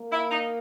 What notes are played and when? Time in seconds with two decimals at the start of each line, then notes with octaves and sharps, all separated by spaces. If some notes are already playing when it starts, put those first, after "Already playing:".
Already playing: A#3
0.12 E4
0.31 D#4